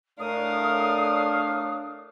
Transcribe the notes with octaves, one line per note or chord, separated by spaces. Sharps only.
A2 A3 D4 A#4 C#5 F5 D#6